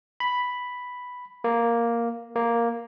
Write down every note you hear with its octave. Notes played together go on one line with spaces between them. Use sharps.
B5
A#3
A#3